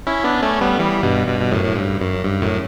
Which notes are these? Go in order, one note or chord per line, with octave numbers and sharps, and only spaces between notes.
C#4 E4
B3 D4
A3 C#4
G3 B3
E3 G3
G2 B2
G2 B2
B2
F#2 A2
A2
G2
F#2
G2
F#2 A2